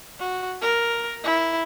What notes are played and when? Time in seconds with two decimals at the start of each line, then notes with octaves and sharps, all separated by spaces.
0.20 F#4
0.62 A#4
1.24 E4